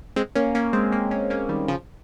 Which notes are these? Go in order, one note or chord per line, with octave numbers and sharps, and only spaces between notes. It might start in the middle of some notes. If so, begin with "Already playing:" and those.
G#3 C4
A#3 C#4
A#3 C#4
G#3 C4
A#3 C#4
A#3 C#4
A#3 C#4
D#3 G3
C#3 F3